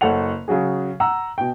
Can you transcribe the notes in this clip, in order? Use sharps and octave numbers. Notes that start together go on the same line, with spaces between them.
F#1 A4 C#5 F#5 F7
C#3 F#3 F#4 G#4
F#5 A#5 E6
B2 G5